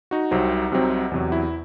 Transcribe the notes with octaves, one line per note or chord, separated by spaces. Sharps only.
D#4 F#4
C2 C3 F#3 C4
C2 C3 F#3 C4
E2 C3 F#3
E4